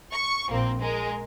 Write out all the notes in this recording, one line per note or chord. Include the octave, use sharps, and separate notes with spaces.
C#6
A#1 A#3 C4
G#3 A#4